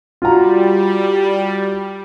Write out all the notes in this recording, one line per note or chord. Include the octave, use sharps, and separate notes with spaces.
G3 F4 F#4 A#5